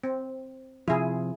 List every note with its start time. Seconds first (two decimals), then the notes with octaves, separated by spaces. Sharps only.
0.04 C4
0.88 C3 F3 E4 G#4